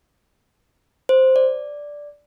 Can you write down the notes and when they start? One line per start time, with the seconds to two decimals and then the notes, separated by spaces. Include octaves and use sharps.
1.09 C5
1.36 D5